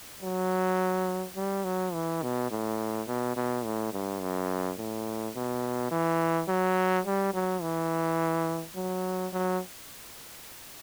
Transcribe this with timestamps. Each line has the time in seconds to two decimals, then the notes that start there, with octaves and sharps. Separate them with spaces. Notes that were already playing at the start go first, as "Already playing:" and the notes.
0.23 F#3
1.36 G3
1.64 F#3
1.93 E3
2.23 B2
2.51 A2
3.08 B2
3.36 B2
3.65 A2
3.93 G2
4.21 F#2
4.78 A2
5.35 B2
5.91 E3
6.48 F#3
7.06 G3
7.34 F#3
7.62 E3
8.76 F#3
9.33 F#3